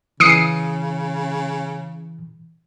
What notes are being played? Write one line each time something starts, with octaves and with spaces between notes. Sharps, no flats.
C#3 E3 D#6 C7 C#7